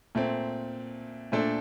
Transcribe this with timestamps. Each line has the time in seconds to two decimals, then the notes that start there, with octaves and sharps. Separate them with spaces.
0.15 A#2 A3 C4
1.32 A#2 A3 D4 A4 C5